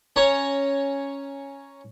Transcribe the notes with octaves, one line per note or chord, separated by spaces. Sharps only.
C#4 C#5 A#5 C#6